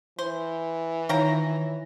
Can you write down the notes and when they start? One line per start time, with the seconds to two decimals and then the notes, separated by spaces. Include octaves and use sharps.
0.19 E3 C5
1.09 D#3 F3 C#5 G5 A#5 A#6